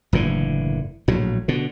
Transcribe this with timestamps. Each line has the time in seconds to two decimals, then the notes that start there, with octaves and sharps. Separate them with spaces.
0.13 F#1 A2 D3 E3
1.08 A#1 A2 F#3
1.48 B2 D3